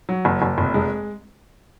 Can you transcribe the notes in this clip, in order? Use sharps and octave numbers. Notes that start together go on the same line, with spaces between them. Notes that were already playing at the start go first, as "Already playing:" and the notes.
F#3
F#1
F#1
F1
G#3